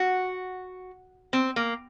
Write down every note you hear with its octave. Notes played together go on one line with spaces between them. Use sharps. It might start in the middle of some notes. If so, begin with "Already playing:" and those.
Already playing: F#4
C4
A#3